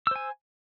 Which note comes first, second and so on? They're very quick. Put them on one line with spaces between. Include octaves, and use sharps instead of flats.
E6 C5 G#5